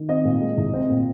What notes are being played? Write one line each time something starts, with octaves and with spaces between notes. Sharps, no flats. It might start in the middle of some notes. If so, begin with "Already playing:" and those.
Already playing: D#3
C4 D#5
A#2
G#3
C2
C4
A#2